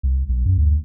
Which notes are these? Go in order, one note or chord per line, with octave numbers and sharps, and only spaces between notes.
C2
B1
F#2
D2